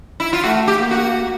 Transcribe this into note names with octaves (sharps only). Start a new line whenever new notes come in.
E4
F4
A3 F#4
G4
A#3
F#4